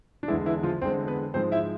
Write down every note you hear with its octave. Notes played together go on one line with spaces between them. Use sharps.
D4
E2 D3 E3 G#3 E4
E3 E4
F3 F4
E2 D3 G#3 C4 C5
B3 B4
G#2 F3 G#3 C4 C5
E4 E5